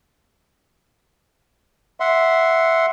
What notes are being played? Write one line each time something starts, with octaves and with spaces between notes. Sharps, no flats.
E5 F#5 C6